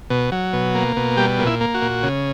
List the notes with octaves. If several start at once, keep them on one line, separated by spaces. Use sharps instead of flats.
B2
F#3
B2
A#3
B2
G3 G4
A#2
E4
A#3
F#4
A#2
C#3